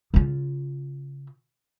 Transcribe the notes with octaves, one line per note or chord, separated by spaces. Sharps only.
C#3 F4